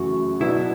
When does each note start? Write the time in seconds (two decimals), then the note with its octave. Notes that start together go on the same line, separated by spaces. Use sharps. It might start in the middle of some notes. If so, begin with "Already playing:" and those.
Already playing: F#2 C#3 E3 A3 F#4
0.40 B2 F#3 B3 D4 E4